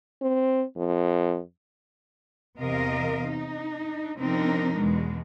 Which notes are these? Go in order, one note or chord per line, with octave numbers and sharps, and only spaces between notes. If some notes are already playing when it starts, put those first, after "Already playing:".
C4
F2
E2 C3 A#4 D#5 F5
D#4
C3 F3 C4 D4 D#4 A#4
E2 B2 G#3